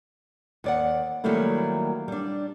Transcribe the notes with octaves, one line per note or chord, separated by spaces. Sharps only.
D#2 D5 F#5
D#3 F#3 G3 A3 A#3 E4
G3 D4